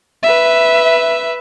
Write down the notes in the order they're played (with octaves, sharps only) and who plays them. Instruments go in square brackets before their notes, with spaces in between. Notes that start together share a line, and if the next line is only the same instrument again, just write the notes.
[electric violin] B4 E5